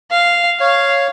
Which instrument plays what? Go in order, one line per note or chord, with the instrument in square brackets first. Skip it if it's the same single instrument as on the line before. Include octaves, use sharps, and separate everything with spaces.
[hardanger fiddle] F5
[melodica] C#5 [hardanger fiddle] F5